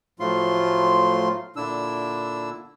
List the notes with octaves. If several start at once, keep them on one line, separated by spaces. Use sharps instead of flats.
A2 F3 F#3 A3 F4 C6
A#2 D3 D4 E4 E6